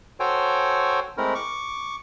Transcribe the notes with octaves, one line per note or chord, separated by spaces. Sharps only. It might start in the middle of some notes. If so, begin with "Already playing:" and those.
F#4 A4 C5 C#5 G5 G#5
G#3 A3 C4 E4 A#4
C#6 D6